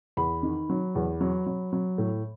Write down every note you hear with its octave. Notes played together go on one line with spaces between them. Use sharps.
E2 B5
D#3
F#3
E2
F#3
F#3
F#3
A2